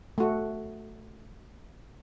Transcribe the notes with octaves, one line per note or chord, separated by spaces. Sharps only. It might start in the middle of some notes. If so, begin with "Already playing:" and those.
A3 F#4